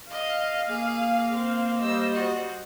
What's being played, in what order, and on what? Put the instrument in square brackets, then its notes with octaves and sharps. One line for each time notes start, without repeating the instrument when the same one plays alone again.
[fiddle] D#5 [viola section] F5
[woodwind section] A#3 [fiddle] G#4
[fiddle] C4
[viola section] G3 C5 D#5 [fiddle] E6
[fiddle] F#4